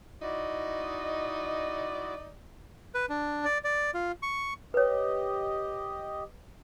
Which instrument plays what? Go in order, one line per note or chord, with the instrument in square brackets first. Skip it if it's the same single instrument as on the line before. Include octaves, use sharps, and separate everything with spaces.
[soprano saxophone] D#4 [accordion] E4 F#4 D#5 [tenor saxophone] D5
[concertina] B4
D4
D5
D5
F4
C#6
[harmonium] G4 D#5 [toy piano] B4 C#5